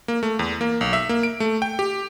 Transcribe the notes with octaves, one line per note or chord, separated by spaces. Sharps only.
A#3
A3
E2
A#3
B1
E5
A#3
D7
A3
G5
G4